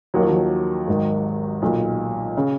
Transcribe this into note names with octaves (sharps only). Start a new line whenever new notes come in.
D#2 D#3 F#3
F3
F#3
G#1 G#2 D#3
B1 A#2
C#3